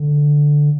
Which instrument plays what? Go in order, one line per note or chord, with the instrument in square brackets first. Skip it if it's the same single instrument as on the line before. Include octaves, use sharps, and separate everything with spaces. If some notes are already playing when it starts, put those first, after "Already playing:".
Already playing: [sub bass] D3